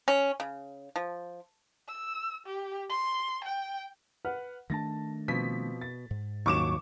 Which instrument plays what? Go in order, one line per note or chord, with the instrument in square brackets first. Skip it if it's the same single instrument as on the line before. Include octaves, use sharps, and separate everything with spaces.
[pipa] C#4
C#3
F3
[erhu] E6
G4
C6
G5
[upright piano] B4 F#5 F6
[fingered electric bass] D#3 A3 D4 [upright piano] A5 A6 A#6
[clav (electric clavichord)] B2 [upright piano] F3 C4 [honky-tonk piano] B6
[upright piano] A6
[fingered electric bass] G#2
[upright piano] D#1 [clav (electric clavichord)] D#2 F#3 [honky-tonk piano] C#6 D6 E7